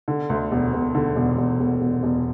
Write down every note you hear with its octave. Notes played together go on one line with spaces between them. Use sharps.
D3
D2
E1
E1
D3
E1
E1
E1
E1
E1